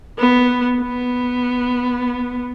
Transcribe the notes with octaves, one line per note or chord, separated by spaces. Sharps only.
B3
B3